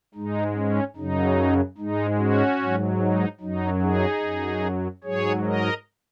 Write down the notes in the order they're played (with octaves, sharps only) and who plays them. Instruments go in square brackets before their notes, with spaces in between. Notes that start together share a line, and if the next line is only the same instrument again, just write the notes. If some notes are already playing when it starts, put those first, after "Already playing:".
[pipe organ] G#2 G#3 D#4
C#4
F#2 C#3 F#3 D#4
G#2 G#3 D#4
C#4 F#4
G#2 F#3
D#4
F#2 F#3 D#4
D#4 G#4
F#2 F#3
G#2 F#3 G#4 C#5
A#4 D#5